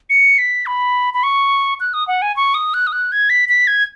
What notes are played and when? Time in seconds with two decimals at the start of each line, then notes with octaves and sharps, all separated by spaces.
0.10 C#7
0.38 B6
0.66 B5
1.14 B5
1.23 C#6
1.80 F#6
1.94 D#6
2.08 F#5
2.22 G#5
2.36 C#6
2.54 D#6
2.74 F#6
2.87 D#6
2.92 F#6
3.12 G#6
3.30 B6
3.49 B6
3.67 G#6